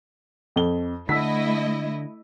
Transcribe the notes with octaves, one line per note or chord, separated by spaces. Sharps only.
F2 G7
D3 A3 E4 D#5 E6 B6